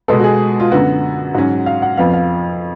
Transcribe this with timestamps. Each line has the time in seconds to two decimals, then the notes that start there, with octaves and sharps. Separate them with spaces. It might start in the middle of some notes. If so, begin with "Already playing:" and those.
0.08 B2 G#3 B3 A4
0.20 F#4
0.24 G#4
0.60 F4
0.71 F#2 D3 F#3 B3 F#4
1.35 G#2 F#3 C#4 F#4
1.66 F5
1.82 F#5
1.97 F2 F3 B3 F5
2.14 F5